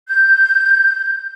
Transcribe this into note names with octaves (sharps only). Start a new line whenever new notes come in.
G6